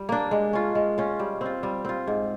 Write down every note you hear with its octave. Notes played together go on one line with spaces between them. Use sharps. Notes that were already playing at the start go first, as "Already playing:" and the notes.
Already playing: G3
A#3 D4
G#3
C#4 F4
G#3
C#4 F4
G3
C4 F4
G3
C4 F4
G#2